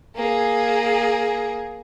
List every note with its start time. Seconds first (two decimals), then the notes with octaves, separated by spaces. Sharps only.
0.15 A#3 G#4